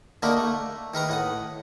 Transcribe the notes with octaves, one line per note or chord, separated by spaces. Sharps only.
D3 A3 A#3 D#4 A#4 B5
A3
D#3 A#4 B4 A#5
A2 F#5 D#6